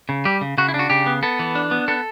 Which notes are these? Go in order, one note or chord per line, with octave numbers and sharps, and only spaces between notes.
C#3
G3 G4
C#3
C#3 F#4
E4
D4
F#4
C#3 G4
B3
B3 A4
E3
D4
B3
B3 A4